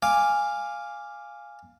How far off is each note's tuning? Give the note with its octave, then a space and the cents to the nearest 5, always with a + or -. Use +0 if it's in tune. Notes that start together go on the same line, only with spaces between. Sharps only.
F5 +0 G#5 -10 D6 +0